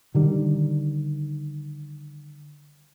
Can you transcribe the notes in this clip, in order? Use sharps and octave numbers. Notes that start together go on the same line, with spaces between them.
D3 D#3 G3